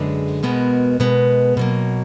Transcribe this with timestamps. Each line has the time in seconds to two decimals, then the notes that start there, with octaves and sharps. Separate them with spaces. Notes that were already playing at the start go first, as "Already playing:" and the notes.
Already playing: F#2 D3 G#3 G#4 B4
0.43 B2 G#3 B3 F#4 A#4
1.00 B2 G#3 B3
1.57 B2 F#3 A#3